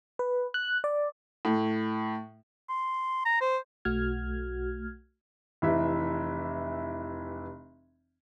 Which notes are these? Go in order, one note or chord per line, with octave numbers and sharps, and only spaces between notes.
B4
F#6
D5
A2
C6
A#5
C5
B1 A3 F#4 F6 G#6
F1 E3 E5